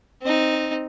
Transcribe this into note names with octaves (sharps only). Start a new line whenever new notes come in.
C4 D#4